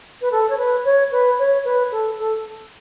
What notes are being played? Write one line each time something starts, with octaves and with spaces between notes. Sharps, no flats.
B4
A4
C#5
B4
C#5
B4
C#5
B4
A4
A4